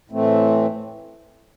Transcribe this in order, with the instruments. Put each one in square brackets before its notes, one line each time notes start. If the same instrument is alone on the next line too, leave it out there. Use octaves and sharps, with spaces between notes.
[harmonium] A2 E3 A3 C4